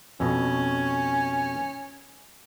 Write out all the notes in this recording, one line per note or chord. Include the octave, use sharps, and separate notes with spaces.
F2 B2 C#4